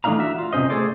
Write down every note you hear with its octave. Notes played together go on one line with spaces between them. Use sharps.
E3 A3 D4 D#4 F5 A#5
F#4 E5
F4
C3 D#3 C#4 C5 D#5
A3 G#4 A4 C5 D5